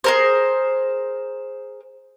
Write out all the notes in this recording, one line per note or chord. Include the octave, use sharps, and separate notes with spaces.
G#4 A#4 C5